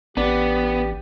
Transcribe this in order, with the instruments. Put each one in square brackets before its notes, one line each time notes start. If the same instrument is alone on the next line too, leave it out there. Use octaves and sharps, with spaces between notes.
[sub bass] A1 [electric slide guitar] B3 [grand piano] D4 [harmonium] G4